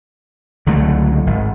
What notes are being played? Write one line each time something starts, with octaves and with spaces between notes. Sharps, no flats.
C#2 D3 F#3 A3
G#1